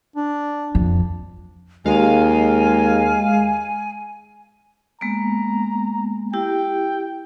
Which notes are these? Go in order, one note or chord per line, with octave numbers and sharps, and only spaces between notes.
D4
F2
D#2 G#3 F5 G#5
G#3 A#3 B3 A#5
E4 G4 G5